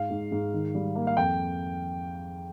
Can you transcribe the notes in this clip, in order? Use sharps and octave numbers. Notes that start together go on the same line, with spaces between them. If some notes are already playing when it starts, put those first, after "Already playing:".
Already playing: G#2 F5
G#2
G#2
D#3
G3
A#3
F5
F2 G5